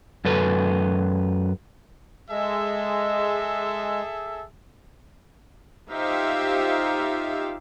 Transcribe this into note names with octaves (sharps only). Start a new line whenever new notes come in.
F#2 A4 B4
G#3 G#4 A4 E5
D#4 F4 G4 C5 E5 F5